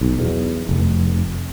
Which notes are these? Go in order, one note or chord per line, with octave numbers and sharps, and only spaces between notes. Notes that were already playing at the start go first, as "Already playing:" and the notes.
B1
E2
F1